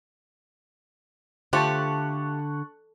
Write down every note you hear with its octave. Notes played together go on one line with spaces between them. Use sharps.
D3 A3 F4 G4 C5 A5 C#6 F#6